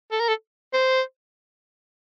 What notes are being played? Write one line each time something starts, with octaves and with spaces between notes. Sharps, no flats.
A4
A#4
A4
C5